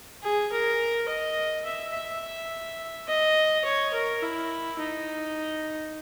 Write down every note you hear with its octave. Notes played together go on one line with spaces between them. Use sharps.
G#4
A#4
D#5
E5
E5
D#5
C#5
A#4
E4
D#4